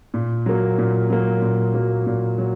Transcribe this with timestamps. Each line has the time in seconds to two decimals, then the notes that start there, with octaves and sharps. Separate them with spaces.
0.14 A#2
0.46 F#3 A#3
0.78 A#2
1.10 F#3 A#3
1.42 A#2
1.74 F#3 A#3
2.06 A#2
2.38 F#3